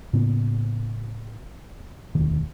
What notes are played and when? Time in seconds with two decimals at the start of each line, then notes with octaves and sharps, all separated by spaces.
0.13 A2 C#3 A#3 B3
2.15 E1 D2 D#3